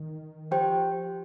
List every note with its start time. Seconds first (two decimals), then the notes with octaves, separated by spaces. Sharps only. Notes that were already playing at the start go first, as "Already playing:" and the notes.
Already playing: D#3
0.51 F3 G4 C5 G5